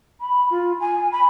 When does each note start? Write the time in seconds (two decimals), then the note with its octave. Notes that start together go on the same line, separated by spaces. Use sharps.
0.21 B5
0.50 F4
0.80 G#5
1.12 B5